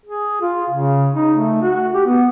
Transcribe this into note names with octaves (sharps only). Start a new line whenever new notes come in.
G#4
F4
C#3
D#4
A3
F#4
G4
B3